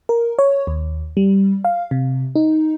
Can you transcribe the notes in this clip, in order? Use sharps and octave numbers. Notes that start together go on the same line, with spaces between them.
A#4
C#5
D#2
G3
F5
C3
D#4